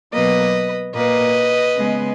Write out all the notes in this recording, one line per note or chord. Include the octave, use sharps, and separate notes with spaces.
B2 F#3 A#3 B4 D#5
A#2 A#3 B4 D#5
C#3 G#3 B3